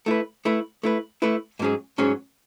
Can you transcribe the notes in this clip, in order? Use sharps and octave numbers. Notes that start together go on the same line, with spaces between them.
A3 E4 B4
A3 E4 B4
A3 E4 B4
A3 E4 B4
G#2 F#3 C#4 G#4
G#2 F#3 C#4 G#4